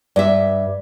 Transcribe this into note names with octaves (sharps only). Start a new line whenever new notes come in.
G2 D5 E5